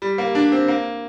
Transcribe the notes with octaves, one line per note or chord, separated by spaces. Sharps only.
G3
A#3
D4
C4
A#3